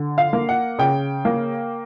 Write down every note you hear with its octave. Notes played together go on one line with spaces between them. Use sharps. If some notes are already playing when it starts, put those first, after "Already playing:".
Already playing: D3
F5
A#3
F#5
C#3 G5
A#3